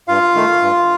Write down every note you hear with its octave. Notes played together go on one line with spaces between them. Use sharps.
G2 F4 F5
D#3 A3
G2